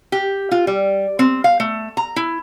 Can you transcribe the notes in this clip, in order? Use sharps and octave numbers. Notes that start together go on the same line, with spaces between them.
G4
F4
G3
C4
F5
A3
A#5
E4